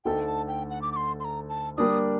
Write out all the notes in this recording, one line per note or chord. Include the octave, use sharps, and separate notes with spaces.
D2 D3 A3 D#4 A4 G5
A5
G5
F#5
D6
D6
C6
C6
A#5
A5
G3 A#3 D4 D#6